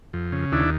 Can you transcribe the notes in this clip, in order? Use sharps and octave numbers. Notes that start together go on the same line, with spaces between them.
F2
C#3
D#2 D4 E4